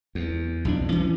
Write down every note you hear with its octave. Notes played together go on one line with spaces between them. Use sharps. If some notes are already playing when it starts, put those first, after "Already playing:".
E2
B1 F2 D4
E3 C#4